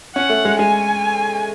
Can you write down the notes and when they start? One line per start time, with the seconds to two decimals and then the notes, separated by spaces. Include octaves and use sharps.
0.16 C#4 F#5
0.30 A3
0.45 G#3
0.59 G#3 G#5